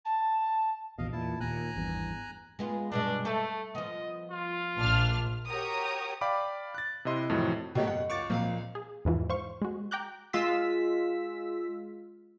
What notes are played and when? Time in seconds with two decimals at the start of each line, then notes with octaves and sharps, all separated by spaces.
0.05 A5
0.98 A#1 E2 B2 D#5 F5
1.13 E2 A#2 E4 A5
1.40 D#2 A#2 G#5 A#5 F#6
1.76 G#1 E2 G2
2.59 G#3 B3 F4
2.92 G2 B2 G#3 D4
3.25 A3 A4
3.75 F3 B3 D#5
4.31 F4
4.76 A#1 D4 F6
5.47 F#4 G4 A#4 C#5 A#5 D#6
6.21 D5 F5 G5 B5 D6
6.74 F#6 A6
7.05 C3 E4 D#5 C6
7.30 F2 A2 C3 E3 F#3
7.75 B2 F#3 A3 A#3 G4 C#5 D#5 G5
7.87 F#2 F#5
8.10 C#2 C#6 D6 A6
8.30 A#2 F3 F#3 A#3 C4 F5
8.75 G#4
9.05 E2 G#2 E3 F3
9.30 C5 F5 C#6
9.62 G#3 F#4
9.91 G5 A#5 D6 F#6 G6
10.33 G#3 F4 E6 B6